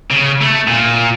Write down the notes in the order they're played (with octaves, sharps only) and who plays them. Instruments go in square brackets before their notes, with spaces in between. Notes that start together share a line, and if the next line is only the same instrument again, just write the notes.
[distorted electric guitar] C#3
A3
A#2